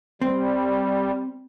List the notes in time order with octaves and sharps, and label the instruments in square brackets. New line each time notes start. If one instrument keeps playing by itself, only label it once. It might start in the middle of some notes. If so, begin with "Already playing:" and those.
[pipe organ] G3 [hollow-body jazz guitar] C4